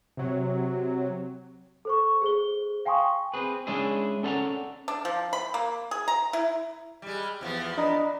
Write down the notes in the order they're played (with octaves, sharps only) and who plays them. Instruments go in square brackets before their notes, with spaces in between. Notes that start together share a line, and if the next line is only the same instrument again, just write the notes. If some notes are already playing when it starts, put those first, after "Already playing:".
[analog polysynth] C3 F#3
[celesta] A4 C5 C#6
G#4 C5 G7
F5 G5 G#5 C6 C#6 D#6
[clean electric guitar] C4 G#4 B4
G#3 C#4 D4 E4 G#4
C#4 A4 D5 F5 F#5 A#5
[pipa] D4
F3
B5
A#3
G#4
A#5
E4
[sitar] G3 G#3
E2 F3 B3
[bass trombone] D4 [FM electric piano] D#5 A#5 B5